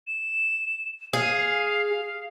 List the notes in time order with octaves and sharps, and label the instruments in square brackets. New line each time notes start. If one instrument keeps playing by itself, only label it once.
[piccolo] E7
[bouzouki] G#4 [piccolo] F5